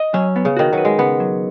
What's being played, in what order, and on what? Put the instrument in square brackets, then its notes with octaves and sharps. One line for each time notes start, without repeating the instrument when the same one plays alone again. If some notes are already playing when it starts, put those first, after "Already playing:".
Already playing: [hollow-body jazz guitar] D#5
[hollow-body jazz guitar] F#3 [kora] C#4
[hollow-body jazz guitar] B3
[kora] C#3
[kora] D#3 [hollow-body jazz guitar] F#4
[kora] F#3 [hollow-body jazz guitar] B4
[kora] G#3
[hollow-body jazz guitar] C#3 [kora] B3
[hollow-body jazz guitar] F#3